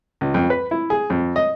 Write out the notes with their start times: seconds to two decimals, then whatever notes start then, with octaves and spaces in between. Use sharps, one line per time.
0.21 C#2
0.34 F2
0.50 B4
0.71 E4
0.90 G#4
1.10 F2
1.36 D#5